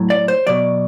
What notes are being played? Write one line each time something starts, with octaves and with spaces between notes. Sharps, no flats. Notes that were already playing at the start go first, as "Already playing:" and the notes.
Already playing: A2 F#3
D5
C5
B2 F#3 D5